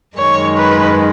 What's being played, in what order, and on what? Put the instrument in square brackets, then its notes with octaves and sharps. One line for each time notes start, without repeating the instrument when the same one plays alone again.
[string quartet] F#2 D#3 G#3 [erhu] C#5
[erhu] B4